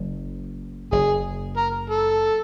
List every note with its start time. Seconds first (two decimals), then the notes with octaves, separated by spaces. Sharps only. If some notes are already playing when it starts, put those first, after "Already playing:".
Already playing: F#1 F#2
0.92 F#1 F#2 G#4
1.57 A#4
1.90 A4